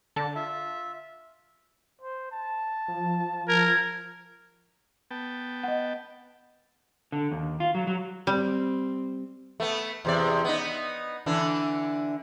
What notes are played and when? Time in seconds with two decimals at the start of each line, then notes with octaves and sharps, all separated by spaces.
0.16 D3 A5
0.36 F4 E5
2.01 C5
2.32 A5
2.88 F3
3.48 A#4 G#6
5.11 B3 G5 A5
5.63 D#5 F#5
7.12 D3
7.31 D#2
7.60 F4
7.75 F#3
7.87 F#3
8.27 G3 C4
9.60 A3 B3
10.05 E2 C3 D5
10.45 B3 D#4
11.26 D3 E3 D4